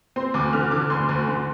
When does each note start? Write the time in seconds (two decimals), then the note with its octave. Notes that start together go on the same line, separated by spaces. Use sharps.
0.16 C4 C6
0.34 D2 D6
0.53 D3 F6
0.71 D3 D6
0.90 D2 C6
1.09 D2
1.27 D3